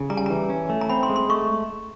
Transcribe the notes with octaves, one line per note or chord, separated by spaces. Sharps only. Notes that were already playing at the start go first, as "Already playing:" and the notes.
Already playing: C#3
G3 A#5
A5
E3 A#5
C#4
A3
A#5
C4 B5
C6
G#3
C6
A3 C#6